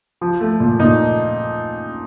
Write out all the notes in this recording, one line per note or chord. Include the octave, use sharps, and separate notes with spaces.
F3
A3
A#2
A#2 D#4